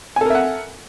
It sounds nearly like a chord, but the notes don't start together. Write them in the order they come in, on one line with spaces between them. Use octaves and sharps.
G#5 A4 A#4 E5 F#5